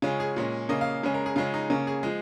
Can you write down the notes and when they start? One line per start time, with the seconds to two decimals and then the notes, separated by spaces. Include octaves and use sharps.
0.02 C#3 G#3 C#4 F4
0.20 G#4
0.36 A#2 G#3 C#4
0.69 C#3 A#3 C#4 D#5
0.81 F5
1.03 C#3 G#3 C#4
1.14 A#4
1.26 G#4
1.36 C#3 G#3 C#4 F4
1.54 D#4
1.70 C#3 A#3 C#4
1.87 G#4
2.03 F3 G#3